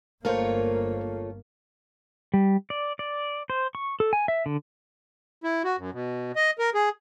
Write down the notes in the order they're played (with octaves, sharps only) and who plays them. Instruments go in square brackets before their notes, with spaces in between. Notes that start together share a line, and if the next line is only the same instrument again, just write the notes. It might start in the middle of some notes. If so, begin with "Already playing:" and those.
[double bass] G1 A#3 [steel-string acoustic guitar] A3 F4 C#5 [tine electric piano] A#4 C5
[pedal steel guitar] G3
D5
D5
C5
C#6
A4
G#5
E5
D3
[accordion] E4
F#4
F#2
B2
D#5
A#4
G#4